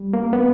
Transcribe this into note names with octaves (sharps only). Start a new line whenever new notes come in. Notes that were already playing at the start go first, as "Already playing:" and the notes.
Already playing: G3
A#3
B3